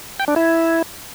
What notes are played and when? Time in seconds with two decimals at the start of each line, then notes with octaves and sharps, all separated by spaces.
0.20 G5
0.28 D4
0.36 E4